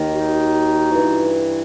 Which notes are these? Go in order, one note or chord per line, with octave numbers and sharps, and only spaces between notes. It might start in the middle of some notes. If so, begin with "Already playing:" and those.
Already playing: D#2 D#3
D#4 F#4
E3
G2